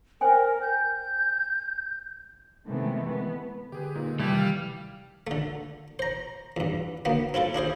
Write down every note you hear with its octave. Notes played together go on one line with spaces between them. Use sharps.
A#4 C5 G5 G#5
G6
C3 D#3 E3 G#3 A3 B3
B3
D3 G4 G#4 B4
A#2 G#3 D#4
C3 D#3 E3 G3 A3 E4 G4
F5
D3 A3
C5 A#5
E2 G2
D2 A#3 B3
C4 E4 F4 A4
D4 E4 G#4 C5